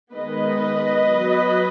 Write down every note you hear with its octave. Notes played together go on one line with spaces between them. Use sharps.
D#3 G#3 B3 B4 D#5
F#3 B3